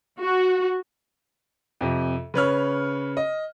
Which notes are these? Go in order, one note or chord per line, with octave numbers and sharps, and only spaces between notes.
F#4
F2 C3
C#3 B4 C#5 F6
D#5